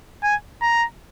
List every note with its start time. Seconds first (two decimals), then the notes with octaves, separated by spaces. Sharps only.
0.23 G#5
0.62 A#5